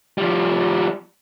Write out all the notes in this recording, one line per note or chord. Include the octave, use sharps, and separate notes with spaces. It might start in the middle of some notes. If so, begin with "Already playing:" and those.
F3 G3